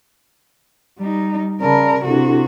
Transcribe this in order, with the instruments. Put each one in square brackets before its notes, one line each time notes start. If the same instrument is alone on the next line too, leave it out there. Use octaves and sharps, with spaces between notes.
[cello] G3 D#4
[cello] C#3 A#4 [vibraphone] D5 A5 B5
[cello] C3 F#4 [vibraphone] D4 E4 A4